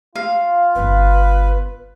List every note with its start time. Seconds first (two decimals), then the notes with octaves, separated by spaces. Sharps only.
0.16 F4 F5
0.75 G1 B3 B4